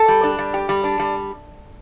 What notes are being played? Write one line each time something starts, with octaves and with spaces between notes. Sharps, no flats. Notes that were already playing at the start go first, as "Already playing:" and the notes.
Already playing: A4
G3
D4
G3
G4
G3
D4
G3